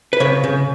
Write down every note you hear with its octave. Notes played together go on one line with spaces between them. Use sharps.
B4
C#3 C#5
C#3